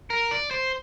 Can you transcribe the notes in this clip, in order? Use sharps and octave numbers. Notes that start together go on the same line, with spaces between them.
A#4
D5
C5